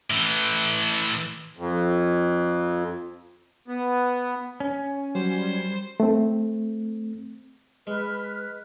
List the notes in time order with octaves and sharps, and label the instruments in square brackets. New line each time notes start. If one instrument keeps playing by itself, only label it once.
[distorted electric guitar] A2 E3
[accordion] F2
B3
[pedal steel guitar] C#4
[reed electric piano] F#3 [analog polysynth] G3 [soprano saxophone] C5
[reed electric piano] A3 C4
[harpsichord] G#3 [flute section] B4 F6